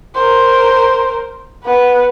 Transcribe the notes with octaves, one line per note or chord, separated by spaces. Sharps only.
A#4 C5
B3 B4